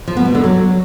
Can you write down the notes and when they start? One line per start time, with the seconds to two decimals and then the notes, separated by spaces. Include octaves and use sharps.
0.08 F3
0.17 B3
0.26 B2
0.35 D3
0.44 F#3